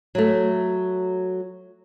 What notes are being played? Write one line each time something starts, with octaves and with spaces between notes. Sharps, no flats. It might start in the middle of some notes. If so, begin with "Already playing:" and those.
F#3 A3